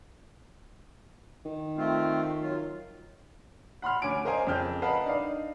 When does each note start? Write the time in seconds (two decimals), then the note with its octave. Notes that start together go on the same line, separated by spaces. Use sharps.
1.45 D#3
1.77 A3 C4 F4
2.42 F#3 F4
3.82 F#5 B5 C6 F6
4.02 D2 C#4 G#5 D6 D7
4.25 A#4 C5 D#5 F5 G#5
4.47 F2 C#3 C4 F6 G6
4.82 A#4 B4 D#5 F5 F#5 A5
5.05 D4 D#4 D5 D#5 F5